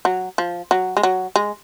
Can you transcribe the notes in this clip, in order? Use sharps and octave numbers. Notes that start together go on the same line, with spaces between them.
F#3
F3
F#3
G#3
F#3
G#3